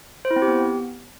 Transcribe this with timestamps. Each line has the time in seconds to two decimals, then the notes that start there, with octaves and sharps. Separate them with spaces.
0.25 C5
0.31 E4
0.36 C4
0.42 G4
0.48 B3